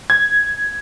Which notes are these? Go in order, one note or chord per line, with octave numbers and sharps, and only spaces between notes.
G#6